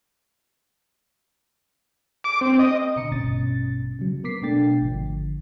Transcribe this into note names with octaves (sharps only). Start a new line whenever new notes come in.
D6
C4
D#5
B2 D3 A#5 C#7
A1 G2 B2 C#4 A6
C#3 F#3
B3 A#4 D6 B6 C7
B2 A3 D4 G5 A6 C7
G#1 D3 F3